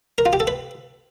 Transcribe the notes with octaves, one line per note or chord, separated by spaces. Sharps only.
A#4
F4
G4
A4
B4